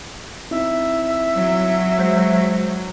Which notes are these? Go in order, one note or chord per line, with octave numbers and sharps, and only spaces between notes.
C4 D#4 E4 E5
F#3
G#3 C5 G6